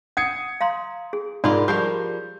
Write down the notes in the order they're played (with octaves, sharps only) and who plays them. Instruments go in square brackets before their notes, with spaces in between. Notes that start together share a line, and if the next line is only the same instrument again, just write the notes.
[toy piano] F#5 [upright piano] D#6 G#6 C#7
[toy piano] F5 A#5 C6
G#4
[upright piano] G#2 [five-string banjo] D4 F4 A#4 [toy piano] D5 B5 C6
[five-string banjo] F3 G3 A#4 [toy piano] G4 G#4 [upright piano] G6